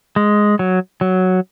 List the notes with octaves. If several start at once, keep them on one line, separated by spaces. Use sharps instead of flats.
G#3
F#3
F#3